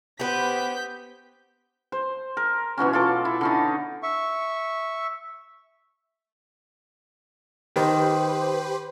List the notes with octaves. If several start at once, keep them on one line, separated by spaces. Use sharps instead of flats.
B3 G4 B4 C5 G6 B6
C5
A#4
B2 E3 F#3 C#4
F4 A4 D6
E4
D3 C#4 D#4
E5 C#6
D#3 G4 B4 C5